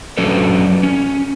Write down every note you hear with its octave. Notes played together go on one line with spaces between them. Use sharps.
F#3 C#4 D4 F#4 A4 B4
C#4